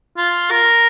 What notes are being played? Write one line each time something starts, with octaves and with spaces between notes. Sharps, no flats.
F4
A#4